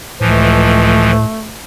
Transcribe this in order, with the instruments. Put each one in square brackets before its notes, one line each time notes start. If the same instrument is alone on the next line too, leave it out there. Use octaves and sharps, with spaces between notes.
[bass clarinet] C#2 [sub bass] A2 [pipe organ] E3 F3 [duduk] A3